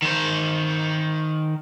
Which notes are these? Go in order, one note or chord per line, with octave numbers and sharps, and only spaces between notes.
D#3 C5